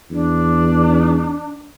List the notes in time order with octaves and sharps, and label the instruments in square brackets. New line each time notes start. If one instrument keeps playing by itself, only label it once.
[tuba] E2 [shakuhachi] D4